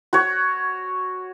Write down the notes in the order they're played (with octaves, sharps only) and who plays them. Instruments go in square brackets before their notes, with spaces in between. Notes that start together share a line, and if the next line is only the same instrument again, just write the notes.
[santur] F#4 C#5